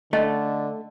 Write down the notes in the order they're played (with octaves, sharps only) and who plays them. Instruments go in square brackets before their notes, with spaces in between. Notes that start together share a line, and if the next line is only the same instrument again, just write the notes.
[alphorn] D3 [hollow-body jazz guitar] A3 [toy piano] C#4 D#5 A5